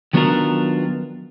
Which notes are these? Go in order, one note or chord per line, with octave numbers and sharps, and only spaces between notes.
D#3 F#3 B3 D4 F4 A#4